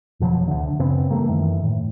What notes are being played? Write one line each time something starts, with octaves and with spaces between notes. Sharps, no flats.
F1 B2 F3 F#3
D2 D3
F#2 C#3 B3 C4
E3 G3 A3 A#3
F#2 D#3 E3
A2